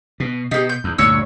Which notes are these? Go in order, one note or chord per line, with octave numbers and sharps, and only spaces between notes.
B2
B2 D#4 G4
G6
E2
D2 G2 A#2 C#5 E6